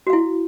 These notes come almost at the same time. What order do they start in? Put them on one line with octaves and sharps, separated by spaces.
F#4 F5 E4